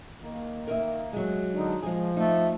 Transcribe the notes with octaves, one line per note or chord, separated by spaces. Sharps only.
D#3 A#3
A#4 D#5 E5
F#3 G#3
D3 D4 D#4
F3 G#3 G#4
A3 D#4